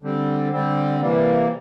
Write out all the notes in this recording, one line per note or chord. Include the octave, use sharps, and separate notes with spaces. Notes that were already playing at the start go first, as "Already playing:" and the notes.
D3 G3 C4
D3 G3 C4
C3 E3 G3 A#3